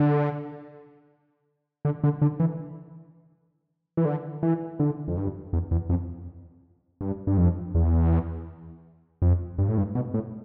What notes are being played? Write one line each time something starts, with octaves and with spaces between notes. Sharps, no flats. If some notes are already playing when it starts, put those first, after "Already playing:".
Already playing: D3
D3
D3
D3
E3
E3
D3
E3
D3
F2
G2
E2
E2
F2
G2
G2
F2
E2
F2
G2
A2
G2
B2
A2